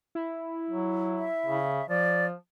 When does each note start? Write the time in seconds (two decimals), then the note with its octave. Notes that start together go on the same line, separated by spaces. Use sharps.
0.15 E4
0.70 F#3
1.19 E5
1.46 C#3
1.89 F3 D5